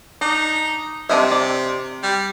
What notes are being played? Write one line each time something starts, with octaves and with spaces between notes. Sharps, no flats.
D4 D#4
C3 D4 D#5 E5
D5
G3